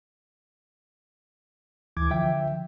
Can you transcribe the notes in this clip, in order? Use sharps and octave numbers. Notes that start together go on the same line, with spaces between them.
D2 E3 D6 G#6
D3 F3 E5 G5